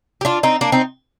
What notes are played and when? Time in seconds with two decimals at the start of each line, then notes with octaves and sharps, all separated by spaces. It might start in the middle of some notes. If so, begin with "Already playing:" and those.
0.21 G4
0.25 D4 F4
0.43 C4 D#4
0.61 A#3 D4
0.72 C4 D#4